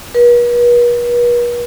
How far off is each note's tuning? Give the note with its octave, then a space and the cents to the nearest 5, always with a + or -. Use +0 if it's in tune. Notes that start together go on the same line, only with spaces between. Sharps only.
B4 -45